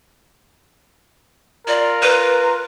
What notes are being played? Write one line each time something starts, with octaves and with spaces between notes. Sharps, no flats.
F4 A#4 D5
B4